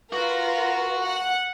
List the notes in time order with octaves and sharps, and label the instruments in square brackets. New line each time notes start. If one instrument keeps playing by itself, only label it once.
[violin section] F4 A#4 B4 [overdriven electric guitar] F#4
[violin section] F#5